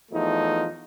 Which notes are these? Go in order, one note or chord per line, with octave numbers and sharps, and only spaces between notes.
E2 F3 A3 D#4